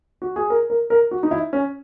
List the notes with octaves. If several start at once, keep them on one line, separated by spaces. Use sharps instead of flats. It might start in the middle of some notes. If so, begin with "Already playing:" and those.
F#4
G#4
A#4
A#4
A#4
F#4
D#4
E4
C#4